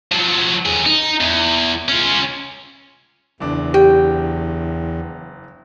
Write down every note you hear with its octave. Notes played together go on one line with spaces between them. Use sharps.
F3 F#3
D#2 G#4
D#4
E2
C#4 F4
F#1 E2 D4
G4 G5